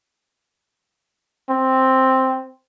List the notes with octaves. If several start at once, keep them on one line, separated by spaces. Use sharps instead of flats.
C4